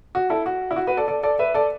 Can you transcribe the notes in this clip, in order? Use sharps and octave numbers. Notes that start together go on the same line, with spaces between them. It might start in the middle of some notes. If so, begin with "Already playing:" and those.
F#4
E4 A4
F#4
E4
F#4
F#4 B4
A4 D5
A4 D5
A4 D5
B4 E5
A4 D5